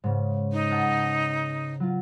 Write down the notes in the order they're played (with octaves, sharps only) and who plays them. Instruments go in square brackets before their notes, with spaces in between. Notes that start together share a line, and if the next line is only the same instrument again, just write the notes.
[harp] G#2 C#3
[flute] D#4
[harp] F#5 A5
F#3 F4